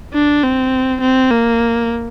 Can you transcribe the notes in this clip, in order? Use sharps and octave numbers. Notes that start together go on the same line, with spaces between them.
D4
C4
C4
A#3